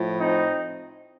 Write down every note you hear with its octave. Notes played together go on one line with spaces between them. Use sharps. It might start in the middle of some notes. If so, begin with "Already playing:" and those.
Already playing: A2 F3
C4 D#4